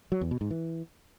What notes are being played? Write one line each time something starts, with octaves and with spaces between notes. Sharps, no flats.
F#3
E2
B2
G#2
E3